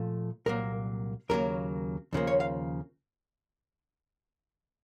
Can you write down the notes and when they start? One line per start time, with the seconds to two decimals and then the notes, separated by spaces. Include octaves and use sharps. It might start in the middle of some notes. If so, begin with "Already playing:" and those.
Already playing: A#2 F3 A3
0.46 C2 A#2 F#3 A#3 A#4
1.29 D#2 C#3 F#3 A#3 A#4
2.13 D#2 C#3 F3 A#3
2.27 C#5
2.40 F5